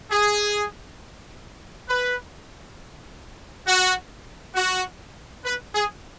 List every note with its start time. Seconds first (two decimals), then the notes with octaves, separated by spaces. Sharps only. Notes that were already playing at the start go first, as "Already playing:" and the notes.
0.12 G#4
1.89 B4
3.67 F#4
4.56 F#4
5.45 B4
5.75 G#4